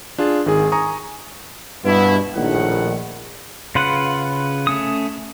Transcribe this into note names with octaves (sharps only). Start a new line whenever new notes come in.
D4 F4 G#4
G#1 D#3 G#4 G#5
G#5 A#5 C#6 D#6
G2 B2 B3 E4
A#1 A2 D#3 F#5
C#3 F4 B4 F#5
A3 C#4 D#6